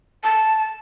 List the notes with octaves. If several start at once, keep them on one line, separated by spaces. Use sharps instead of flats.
A5